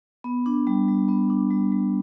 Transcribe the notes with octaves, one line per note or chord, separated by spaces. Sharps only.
B3
D4
G3
G3
B3
D4
G3
G3